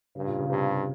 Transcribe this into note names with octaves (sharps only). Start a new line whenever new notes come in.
G2 C#3
A#2
C#3
G2 C3